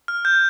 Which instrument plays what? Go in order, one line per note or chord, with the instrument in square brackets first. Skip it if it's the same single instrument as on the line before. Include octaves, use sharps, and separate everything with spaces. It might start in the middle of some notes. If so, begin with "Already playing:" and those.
[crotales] F6
G6